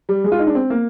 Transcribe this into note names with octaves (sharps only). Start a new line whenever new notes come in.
G3
G#3
F4
D#4
D4
C4
A#3